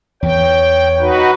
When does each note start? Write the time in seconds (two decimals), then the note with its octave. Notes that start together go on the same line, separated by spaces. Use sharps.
0.23 E2 E3 C#5 G5
1.00 D#4 F#4 B4